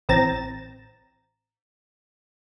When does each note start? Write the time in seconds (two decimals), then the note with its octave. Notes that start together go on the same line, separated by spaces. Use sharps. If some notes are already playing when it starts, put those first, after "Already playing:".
0.09 A1 C4 A#5 A6 E7